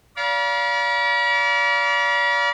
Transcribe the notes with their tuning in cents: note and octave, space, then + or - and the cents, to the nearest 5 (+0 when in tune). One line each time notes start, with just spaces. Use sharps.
D5 -35 F5 +0 B5 -45